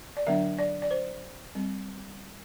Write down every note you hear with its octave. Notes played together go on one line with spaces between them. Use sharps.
D5
D3 F#3 B3 D4 E5
D5
D5
C5
G3 C4